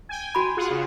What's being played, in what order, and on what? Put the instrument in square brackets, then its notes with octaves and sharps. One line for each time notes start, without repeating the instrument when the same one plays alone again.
[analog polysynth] G5 G#5
[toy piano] F#4 B5
[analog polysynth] F4 G#4 F#5
C#3